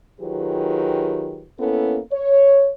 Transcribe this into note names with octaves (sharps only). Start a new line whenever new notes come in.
D#3 F#3 F4 G4 G#4 B4
A#3 B3 C#4 E4 A4
C#5